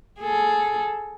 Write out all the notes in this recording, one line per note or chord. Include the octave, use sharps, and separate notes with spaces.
G#4 A4